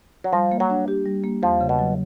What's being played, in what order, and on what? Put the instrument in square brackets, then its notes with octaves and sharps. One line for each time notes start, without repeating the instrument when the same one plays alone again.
[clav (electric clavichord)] F#3
[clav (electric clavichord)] F3 [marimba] G3
[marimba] A#3
[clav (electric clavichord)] F#3
[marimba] D4
G4
G3
A#3
[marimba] E2 [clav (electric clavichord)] F3
[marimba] C#3
[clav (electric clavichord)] B2
[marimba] F#3